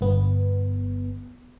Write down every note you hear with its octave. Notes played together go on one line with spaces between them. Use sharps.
G1 B3